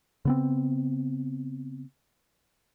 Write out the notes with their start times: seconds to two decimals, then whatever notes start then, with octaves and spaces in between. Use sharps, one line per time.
0.25 C#3 B3 C4